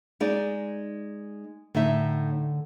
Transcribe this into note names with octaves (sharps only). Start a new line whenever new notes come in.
G#3 D#4 D5
A2 D3 D#4 E5